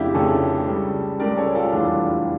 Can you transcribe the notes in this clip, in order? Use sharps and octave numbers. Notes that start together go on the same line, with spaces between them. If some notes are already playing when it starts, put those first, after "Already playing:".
Already playing: F1 F2 C#3 D4 E4 F4 G4
F1 F2 C#3 A4 C#5
C#2 C#3 G3
C#2 C#3 G3 A#4 D5
A4 C#5
F4 A4
F1 E2 E3 G3 D4 F4